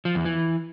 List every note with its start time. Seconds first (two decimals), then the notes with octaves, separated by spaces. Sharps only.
0.05 F3
0.15 E2
0.25 E3